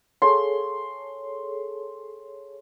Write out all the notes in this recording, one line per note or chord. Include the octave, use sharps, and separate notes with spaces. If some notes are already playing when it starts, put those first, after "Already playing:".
G#4 A4 C#5 C6